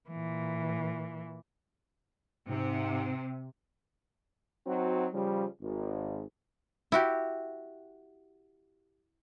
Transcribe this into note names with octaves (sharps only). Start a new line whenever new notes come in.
A#2 E3
G#2 C3
F#3 C4 D#4 F#4
C#3 F3 G3
G#1
E4 F#4 G4